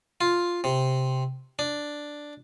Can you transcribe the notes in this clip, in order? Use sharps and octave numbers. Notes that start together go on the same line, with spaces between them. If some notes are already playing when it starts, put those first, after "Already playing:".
F4
C3
D4